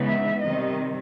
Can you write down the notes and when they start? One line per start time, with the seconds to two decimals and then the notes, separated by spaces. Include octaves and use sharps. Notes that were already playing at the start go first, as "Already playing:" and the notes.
Already playing: C#3 E3 G#3 B3 D#4
0.08 E5
0.42 C3 D#3 G3 C4 D#5